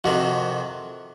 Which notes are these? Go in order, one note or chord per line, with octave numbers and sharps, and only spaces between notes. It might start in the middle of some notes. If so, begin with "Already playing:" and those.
F2 C3 D#3 F#4